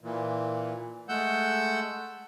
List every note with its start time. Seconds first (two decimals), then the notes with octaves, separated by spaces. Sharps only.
0.01 A#2 E3
1.09 G#3 A3 F#5 E6 G6